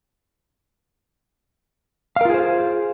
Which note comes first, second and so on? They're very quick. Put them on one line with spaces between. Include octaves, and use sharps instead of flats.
F5 A#4 F4 G#4 C5